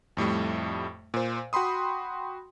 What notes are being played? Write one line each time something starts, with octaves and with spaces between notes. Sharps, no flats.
F2 A2 G3 A3
A#2 C5
F#4 G5 B5 C6 D#6